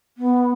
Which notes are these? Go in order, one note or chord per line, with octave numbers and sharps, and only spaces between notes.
B3